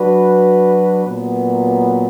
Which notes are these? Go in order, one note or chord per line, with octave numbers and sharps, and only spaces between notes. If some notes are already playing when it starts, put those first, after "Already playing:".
Already playing: F#3 D4 F#4 B4
A#2 F#3 B3